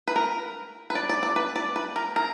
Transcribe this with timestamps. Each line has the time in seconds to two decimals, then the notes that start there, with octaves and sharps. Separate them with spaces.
0.08 B4
0.16 A#4
0.90 B4
0.95 D5
1.09 D5
1.23 D5
1.36 B4
1.56 D5
1.76 B4
1.96 A#4
2.16 A#4